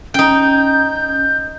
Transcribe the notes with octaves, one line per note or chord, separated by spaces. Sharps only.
C#4 D#4 G5 G6